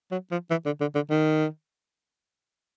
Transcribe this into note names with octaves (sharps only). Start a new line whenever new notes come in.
F#3
F3
E3
D3
D3
D3
D#3